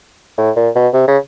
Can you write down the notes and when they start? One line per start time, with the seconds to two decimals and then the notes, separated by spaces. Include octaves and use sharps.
0.38 A2
0.56 A#2
0.75 B2
0.94 C3
1.08 C#3